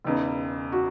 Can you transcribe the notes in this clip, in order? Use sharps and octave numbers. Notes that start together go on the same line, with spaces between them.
E1 E2 C#3 D#4
F#4